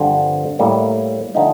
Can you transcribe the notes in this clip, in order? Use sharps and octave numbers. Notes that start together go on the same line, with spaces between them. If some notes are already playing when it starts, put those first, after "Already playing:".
Already playing: G2 D3 F3 C4
A2 G3 A#3
D3 F3 A3 C4 D#4